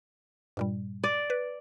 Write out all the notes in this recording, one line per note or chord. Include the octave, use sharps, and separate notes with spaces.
G2 A#2 G3
D5
B4